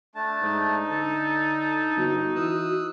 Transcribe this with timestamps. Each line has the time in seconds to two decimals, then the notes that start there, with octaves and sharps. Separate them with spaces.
0.15 A3 D4 A5
0.42 G#2 D#4
0.90 D3 A4 A5
1.97 G1 F#4
2.35 E3 D#6 E6 F#6